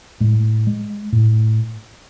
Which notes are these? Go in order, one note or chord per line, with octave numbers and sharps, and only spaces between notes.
A2 G#3
G#3
A2